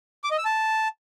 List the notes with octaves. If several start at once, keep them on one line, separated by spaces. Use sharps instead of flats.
D6
D#5
E6
A5